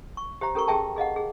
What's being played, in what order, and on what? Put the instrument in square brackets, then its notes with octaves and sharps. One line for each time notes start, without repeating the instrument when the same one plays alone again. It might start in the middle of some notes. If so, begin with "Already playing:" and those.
[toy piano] C#6
G4 C5 E5 A#5
C#4 G4 A4 A#4 A#5 C#6
C#4 G4 G#4 E5 G5 A5
G#4 D#5 F5 F#5
G#4